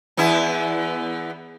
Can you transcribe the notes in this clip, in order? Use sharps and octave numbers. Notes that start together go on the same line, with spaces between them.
E2 B3 E4